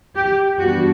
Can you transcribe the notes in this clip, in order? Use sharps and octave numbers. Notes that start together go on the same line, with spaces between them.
G4
G2 E3 B3 D4 F#4